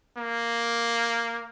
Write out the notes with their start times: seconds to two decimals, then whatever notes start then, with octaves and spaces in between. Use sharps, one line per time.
0.18 A#3